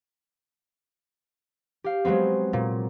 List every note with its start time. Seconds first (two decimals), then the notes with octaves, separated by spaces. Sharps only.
1.84 G4 F5
2.05 F#3 G#3 B3 C4
2.53 A#2